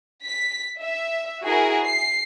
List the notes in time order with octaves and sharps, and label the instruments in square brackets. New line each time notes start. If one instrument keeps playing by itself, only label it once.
[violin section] B6
E5
E4 F#4 G#4 A#4
C7